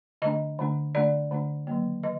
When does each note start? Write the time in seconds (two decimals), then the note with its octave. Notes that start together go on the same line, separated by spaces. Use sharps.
0.22 D3 A3 D4 D#5
0.59 D3 A3 D4
0.95 D3 A3 D4 D5
1.31 D3 A3 D4
1.67 D#3 F#3 A#3
2.03 D#3 D#5